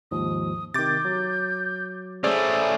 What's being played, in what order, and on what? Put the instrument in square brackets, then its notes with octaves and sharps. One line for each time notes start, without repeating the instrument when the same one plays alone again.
[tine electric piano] D#2 G#2 F3 [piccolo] D#6
[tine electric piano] C3 D#3 [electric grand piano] D6 A6 [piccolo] G6
[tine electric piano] F#3
[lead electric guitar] A3 C#4 [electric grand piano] G#4 C5 D5 [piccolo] E6